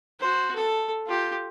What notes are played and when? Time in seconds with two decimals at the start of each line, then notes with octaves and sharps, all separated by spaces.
0.20 F#4 C5
0.55 A4
1.06 F4 G4